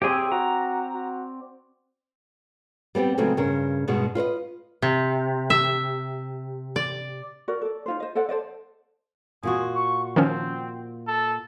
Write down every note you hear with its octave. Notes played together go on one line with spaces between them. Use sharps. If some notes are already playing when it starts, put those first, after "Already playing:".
C3 C4 G4 G#4 D5 G5
F#4 A#5
F#4
G3 B3 C4 G4
C#3 F#3 G#3 A3 B3 C4
G2 C#3 A#4
G2 B2 G#3 F#4
F4 B4 C5 D#5
C3
E5
D5
F#4 A#4 D5
A4 D5
D#4 F4 C5
C5 D#5
A4 C5 D5 F#5
A4 C5 D5 D#5
A#2 F4 F#4 G#4
C#6
D#3 F3 C4 C#4
A4